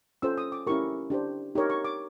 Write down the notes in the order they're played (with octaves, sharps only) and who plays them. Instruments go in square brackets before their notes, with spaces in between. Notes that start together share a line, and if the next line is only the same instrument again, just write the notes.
[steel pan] C#4 F4 A4 C5 E6
D#6
D6
C#4 E4 G4 A#4 C#6
D4 G4 C5
D#4 G4 A#4 C#5
C#6
D6